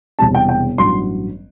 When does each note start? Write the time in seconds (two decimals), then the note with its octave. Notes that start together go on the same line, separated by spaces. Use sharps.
0.19 E1 E2 C3 G3 A5
0.35 G5
0.49 G5
0.78 A1 G2 F#3 C6